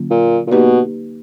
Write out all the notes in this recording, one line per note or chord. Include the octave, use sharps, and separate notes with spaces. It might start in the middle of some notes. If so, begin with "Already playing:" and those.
Already playing: D3 F#3 A#3 C#4 F4
A#2
A#2
B2 A#3 D#4 G4 B4 D5